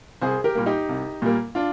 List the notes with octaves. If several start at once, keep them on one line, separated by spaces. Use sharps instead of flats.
C2 G#4 C5
G4 A#4
A#2 G3 A#3
D#4 G4
C2
A#2 G3 A#3
D4 F4